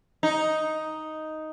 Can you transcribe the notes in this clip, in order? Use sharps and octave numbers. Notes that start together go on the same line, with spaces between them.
D#4